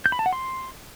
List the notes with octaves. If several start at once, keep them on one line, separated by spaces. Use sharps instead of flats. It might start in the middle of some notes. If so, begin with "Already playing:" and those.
G6
B5
A5
F#5
C6